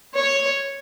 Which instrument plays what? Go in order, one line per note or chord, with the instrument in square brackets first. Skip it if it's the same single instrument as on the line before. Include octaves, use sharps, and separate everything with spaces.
[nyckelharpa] C#5